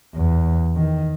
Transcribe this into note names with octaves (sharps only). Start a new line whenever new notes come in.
E2
D#3